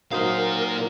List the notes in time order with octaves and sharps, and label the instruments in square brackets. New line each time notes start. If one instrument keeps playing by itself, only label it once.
[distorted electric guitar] A#2 F5 [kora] F#3 D#4 C5 [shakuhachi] A#4